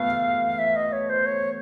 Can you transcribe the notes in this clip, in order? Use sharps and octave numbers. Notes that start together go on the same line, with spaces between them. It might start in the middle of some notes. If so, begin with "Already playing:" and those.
Already playing: A3 B3 F5
E5
D#5
C#5
C5
C#5